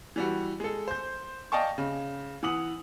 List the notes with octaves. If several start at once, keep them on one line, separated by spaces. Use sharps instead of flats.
E3 G3 F#4
G#3 A4
C5 G6
D5 D#5 F5 G5 A5 C#6
C#3
E3 F#5 D#6 F#7